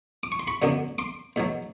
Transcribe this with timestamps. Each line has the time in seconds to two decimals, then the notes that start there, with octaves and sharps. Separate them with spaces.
0.23 D6
0.32 C#6
0.40 C6
0.47 B5 C#6
0.62 F#2 D3 F#3 B3 D4
0.98 C6 D6
1.36 E2 B2 F#3